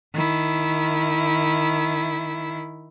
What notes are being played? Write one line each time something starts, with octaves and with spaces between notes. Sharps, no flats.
D#3 E4